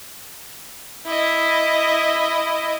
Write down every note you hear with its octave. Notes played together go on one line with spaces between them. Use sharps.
E4 D#5